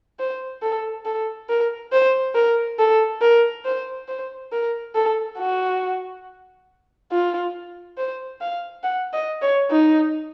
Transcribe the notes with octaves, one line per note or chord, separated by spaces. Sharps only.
C5
A4
A4
A#4
C5
A#4
A4
A#4
C5
C5
A#4
A4
F#4
F4
C5
F5
F#5
D#5
C#5
D#4